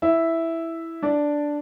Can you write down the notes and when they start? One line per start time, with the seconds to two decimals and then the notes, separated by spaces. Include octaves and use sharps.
0.02 E4 E5
1.02 D4 D5